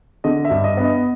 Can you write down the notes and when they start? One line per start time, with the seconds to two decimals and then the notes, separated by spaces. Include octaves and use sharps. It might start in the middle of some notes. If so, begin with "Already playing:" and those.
0.24 D3 D#5
0.45 E5
0.50 G2
0.64 D#5
0.77 B3
0.84 D#5